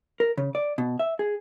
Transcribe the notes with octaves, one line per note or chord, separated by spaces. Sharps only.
A#4
C#3
D5
B2
E5
G#4